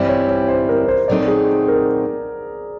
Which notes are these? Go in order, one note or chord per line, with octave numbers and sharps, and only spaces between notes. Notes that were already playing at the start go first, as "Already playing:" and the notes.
Already playing: G2 E3 G3 C4 E4 D5
C#5
C#5
C5
A#4
C5
A#2 F#3 A3 C4 D#4 D5
G#4
A#4